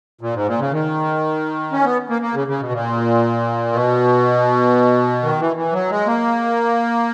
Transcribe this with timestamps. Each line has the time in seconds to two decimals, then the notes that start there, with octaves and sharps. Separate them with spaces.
0.21 A#2
0.34 G#2
0.47 A#2
0.59 C#3
0.72 D#3
1.72 C#4
1.84 B3
2.10 A#3
2.22 A#3
2.34 C#3
2.48 C#3
2.60 B2
2.72 A#2
3.72 B2
5.23 D#3
5.39 E3
5.56 E3
5.73 F#3
5.90 G#3
6.06 A#3